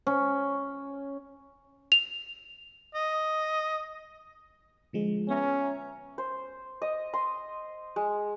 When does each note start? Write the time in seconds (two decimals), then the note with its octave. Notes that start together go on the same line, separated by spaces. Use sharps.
0.07 C#4
1.92 F7
2.95 D#5
4.93 D3 F3 G#3
5.29 B3 C#4 E5 A#5
6.18 C5
6.82 D#5
7.13 C6
7.96 G#3